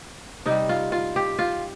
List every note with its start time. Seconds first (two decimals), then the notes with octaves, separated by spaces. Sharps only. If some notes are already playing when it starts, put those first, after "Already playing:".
0.46 C3 G3 D#4
0.69 F4
0.92 F4
1.16 G4
1.39 F4